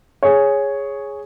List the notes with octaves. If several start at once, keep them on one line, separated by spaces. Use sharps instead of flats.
G#4 C#5